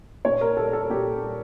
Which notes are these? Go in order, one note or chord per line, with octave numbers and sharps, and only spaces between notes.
A#2 C#5
A#4
G3 A4
A4
A#2 G4
G3